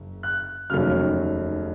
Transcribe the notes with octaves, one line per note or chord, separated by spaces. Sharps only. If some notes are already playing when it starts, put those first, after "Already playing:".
Already playing: F#1
F#6
F1 D#2 C#3 F#3 F6